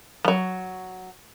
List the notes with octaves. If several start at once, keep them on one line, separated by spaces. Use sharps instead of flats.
F3 F#3